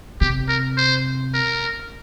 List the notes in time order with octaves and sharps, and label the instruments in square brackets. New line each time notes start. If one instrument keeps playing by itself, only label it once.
[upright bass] C3 [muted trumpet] G4
[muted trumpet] A#4
C5
A#4